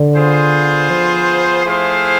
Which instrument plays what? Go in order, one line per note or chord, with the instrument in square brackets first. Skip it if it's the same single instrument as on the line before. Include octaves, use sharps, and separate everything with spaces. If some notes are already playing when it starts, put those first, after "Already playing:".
Already playing: [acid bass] D3
[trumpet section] B3 F4 G#4 C5
[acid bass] F3
[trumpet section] A3 E4 G#4 C5 F5